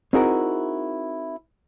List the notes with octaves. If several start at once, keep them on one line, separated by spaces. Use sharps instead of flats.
C4 D#4 E4 F#4 G#4 A#4